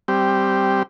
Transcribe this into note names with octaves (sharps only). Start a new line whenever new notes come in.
G3 C4 G4